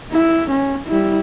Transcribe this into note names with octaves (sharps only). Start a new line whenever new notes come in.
E4
C#4
G3 E4